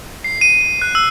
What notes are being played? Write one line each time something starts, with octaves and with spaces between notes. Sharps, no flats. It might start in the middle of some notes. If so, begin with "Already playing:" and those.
C7
D#7
D#7
F#6
E6